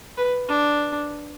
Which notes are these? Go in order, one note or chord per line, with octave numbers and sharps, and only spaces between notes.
B4
D4